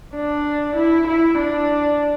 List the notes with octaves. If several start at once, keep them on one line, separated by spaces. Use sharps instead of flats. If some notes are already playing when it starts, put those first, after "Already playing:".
D4
E4
E4
D4